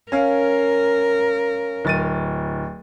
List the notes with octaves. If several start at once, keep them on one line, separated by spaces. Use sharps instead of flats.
C#4 A#4 F5
D1 A6 D#7